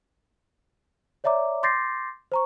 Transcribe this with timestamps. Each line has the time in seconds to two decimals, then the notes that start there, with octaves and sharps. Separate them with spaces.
1.24 C#5 D5 E5 A#5 D6
1.63 C6 D6 G6 A6 A#6 C7
2.32 C5 A#5 C#6